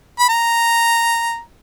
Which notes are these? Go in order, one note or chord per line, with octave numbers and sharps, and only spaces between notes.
B5
A#5